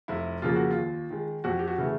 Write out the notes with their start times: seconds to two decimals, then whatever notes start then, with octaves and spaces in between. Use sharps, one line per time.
0.08 F1 E4
0.42 F2 C#3 F3 A#3 F4
0.56 F#4
0.71 F4
0.76 D#2
1.10 D#3 G#3
1.44 F2 F#4
1.59 G4
1.68 F#4
1.78 C#3 E3 A3